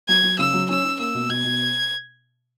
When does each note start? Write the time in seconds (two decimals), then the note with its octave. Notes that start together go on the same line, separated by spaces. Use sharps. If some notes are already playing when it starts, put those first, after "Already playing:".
0.09 F#3 G#6
0.23 F#3
0.39 C#3 E6
0.54 F#3
0.69 C#4 E6
0.85 C#4
0.99 A#3 E6
1.15 B2
1.29 B2 G#6
1.44 B2